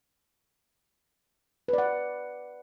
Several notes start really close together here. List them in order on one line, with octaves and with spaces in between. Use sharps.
B4 D5 F#5